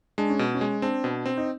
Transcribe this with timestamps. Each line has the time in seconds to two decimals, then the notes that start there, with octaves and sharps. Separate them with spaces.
0.18 G#3 D4
0.30 C#4
0.39 B2
0.54 C#4
0.61 G#3
0.82 C4 D4
1.04 B2
1.26 C4
1.37 D#4